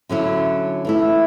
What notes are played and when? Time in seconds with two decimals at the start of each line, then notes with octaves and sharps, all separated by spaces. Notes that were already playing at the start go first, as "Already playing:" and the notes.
0.09 D3 F#3 C#4 E4
0.85 E3 A3 E4